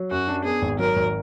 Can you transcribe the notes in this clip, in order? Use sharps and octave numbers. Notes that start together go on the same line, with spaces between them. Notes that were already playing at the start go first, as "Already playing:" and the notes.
Already playing: F#3
F#2 F#4
D4
B3 G#4
G#1
F#3 A#4
G#1